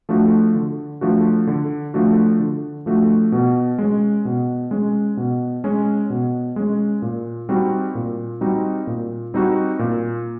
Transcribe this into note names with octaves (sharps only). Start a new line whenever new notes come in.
F3 A3 D4 F#4
D3
F3 A3 D4 F#4
D3
F3 A3 D4 F#4
D3
F3 A3 D4 F#4
B2
G#3 C#4
B2
G#3 C#4
B2
G#3 C#4
B2
G#3 C#4
A#2
G3 C4 D#4 F#4
A#2
G3 C4 D#4 F#4
A#2
G3 C4 D#4 F#4
A#2